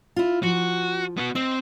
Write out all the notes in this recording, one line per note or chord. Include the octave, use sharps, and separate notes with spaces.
E4 F4
F3 F#4
B3 F#4
C4 D#5